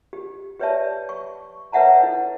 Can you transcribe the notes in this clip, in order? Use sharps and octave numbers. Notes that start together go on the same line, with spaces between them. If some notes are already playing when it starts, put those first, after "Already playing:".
G4
G4 B4 C#5 D5 E5 A5
C#6
B4 C#5 E5 F#5 A5 A#5
E4 A4